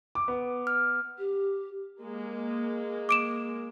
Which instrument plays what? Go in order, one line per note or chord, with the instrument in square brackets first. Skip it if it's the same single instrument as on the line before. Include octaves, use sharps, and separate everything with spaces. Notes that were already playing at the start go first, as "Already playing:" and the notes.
[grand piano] D6
B3
[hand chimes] F6
[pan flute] G4
[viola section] G#3 A#3
[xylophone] D6 D7 E7